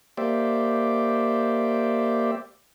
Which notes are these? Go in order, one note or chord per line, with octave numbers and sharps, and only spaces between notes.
A#3 G4 C5 D5 E5